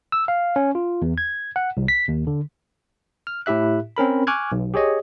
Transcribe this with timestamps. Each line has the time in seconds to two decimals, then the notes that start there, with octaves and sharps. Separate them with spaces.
0.12 E6
0.28 F5
0.56 C#4
0.75 F4
1.02 E2
1.18 G#6
1.56 F#5
1.77 C2
1.88 B6
2.08 D#2
2.27 D3
3.27 F6
3.46 A2 E4 G4 E5 F#6
3.97 C4 C#4 A#4 B5
4.27 G#5 C#6 D6 F6 F#6 G#6
4.52 B1
4.74 G4 G#4 C#5 D#5